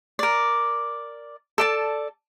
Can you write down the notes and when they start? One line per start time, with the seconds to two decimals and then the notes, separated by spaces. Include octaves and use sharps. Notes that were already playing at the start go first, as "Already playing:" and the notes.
0.19 A#4 D5
1.58 A4 D5 A5